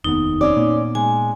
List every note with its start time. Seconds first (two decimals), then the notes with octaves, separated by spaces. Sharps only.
0.04 F1 D#2 B3 D#4
0.41 C4 C#4 D5
0.56 A#2 A#3 B3
0.95 G#3 G#5